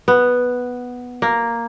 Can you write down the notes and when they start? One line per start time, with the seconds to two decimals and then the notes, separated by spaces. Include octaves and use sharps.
0.08 B3
1.22 A#3